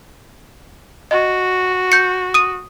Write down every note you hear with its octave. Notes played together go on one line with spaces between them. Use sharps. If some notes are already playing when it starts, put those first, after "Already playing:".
F#4 D#5
G6 C#7
D#6 D#7